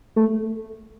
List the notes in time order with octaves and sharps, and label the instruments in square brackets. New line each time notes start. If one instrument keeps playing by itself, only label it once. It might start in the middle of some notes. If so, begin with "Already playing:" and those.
[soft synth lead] A3